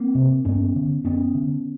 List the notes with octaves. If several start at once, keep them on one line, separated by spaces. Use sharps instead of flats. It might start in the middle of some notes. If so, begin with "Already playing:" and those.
Already playing: A#3 C4
C3
G2 B3 C#4
D3
F#2 B3 C#4
D3